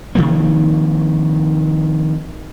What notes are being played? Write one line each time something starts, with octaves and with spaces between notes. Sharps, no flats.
C3 D#3 F3 A#3